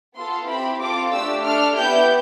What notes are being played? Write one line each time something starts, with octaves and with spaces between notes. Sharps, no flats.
B3 F4 A4 C6
C4 E4 G4 B5
C4 F4 A4 D6
A3 D4 G4 E6
D4 A4 F6
B3 E4 G4 G6